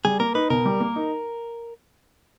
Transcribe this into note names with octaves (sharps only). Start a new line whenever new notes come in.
G3 G#4
A#3 A#4
D#4 B4
B2 A#4
G3
A#3
D#4